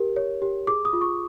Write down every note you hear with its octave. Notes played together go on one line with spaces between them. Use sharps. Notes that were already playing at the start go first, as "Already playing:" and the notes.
Already playing: G4 A#4
C#5
G4
G#4 D6
D#6
F4
C#6